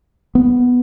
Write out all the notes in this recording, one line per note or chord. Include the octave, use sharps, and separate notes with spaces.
B3